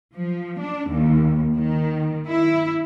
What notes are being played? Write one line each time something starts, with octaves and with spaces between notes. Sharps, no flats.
F3
D4
D#2
D#3
E4